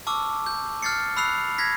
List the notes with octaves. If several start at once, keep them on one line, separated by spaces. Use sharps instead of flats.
A5 C#6 D6 E6 F6
G6
F6 G6 A6 C7 C#7
B5 E6 F#6 C7 F7
G#6 A#6 B6